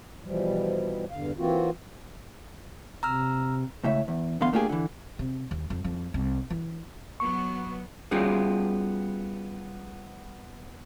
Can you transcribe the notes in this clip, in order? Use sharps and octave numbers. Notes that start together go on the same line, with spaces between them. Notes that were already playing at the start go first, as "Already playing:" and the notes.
B2 E3 F3 G3
E2 G2 D3 F5
E3 A#3 C4 F4 F#4
C3 A#5 E6 F6
C#2 A2 C#3 E5
E2
A#2 D3 E3 B3 F5 C6
A3 A#3 D4 F4 G4 G#4
D3 E3
C3
D#2
F2
F2
C2
E3
F#3 B3 C#6
G3 B3 C#4 F4 F#4 G#4